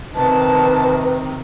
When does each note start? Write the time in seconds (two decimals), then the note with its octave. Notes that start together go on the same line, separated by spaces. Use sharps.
0.15 C3 D#3 B4 A5